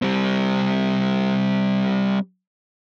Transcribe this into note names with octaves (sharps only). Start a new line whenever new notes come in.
G3 C4